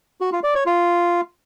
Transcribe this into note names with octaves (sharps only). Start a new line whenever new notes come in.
F#4
F4
D5
C#5
F4